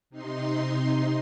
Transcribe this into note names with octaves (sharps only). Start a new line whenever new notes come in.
C3 D#4 C6